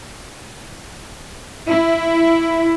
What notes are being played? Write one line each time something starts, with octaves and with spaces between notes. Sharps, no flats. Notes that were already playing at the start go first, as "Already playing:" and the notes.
E4